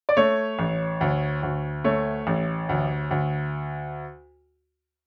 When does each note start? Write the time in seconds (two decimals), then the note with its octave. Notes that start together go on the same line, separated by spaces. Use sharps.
0.09 D5
0.17 A3 C#5
0.59 A1
1.01 D2
1.43 D2
1.84 A3 C#5
2.27 A1
2.69 D2
3.11 D2